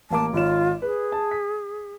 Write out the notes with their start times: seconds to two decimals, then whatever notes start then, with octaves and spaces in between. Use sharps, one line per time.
0.11 A1 A#3 A5 D6
0.33 G#1 F4 C#5 E7
0.82 G#4 B4
1.12 A5
1.31 B6